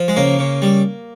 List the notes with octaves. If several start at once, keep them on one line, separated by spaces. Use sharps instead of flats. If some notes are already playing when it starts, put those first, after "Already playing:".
Already playing: F3
G#3
C#3 A#3
C#3
G3